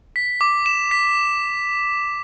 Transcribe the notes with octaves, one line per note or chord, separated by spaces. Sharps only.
B6
D6
E7
B6